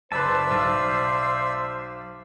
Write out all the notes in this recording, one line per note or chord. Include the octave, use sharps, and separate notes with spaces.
F#1 B4 C5 D5 E5 A5 E6
B1